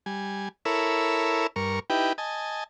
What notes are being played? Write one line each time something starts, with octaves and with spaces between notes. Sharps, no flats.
G3 G#5
E4 A4 A#4 C#5 B5 E6
G2 A#4 C#6
D#4 E4 G4 B4 G5
D#5 G#5 A5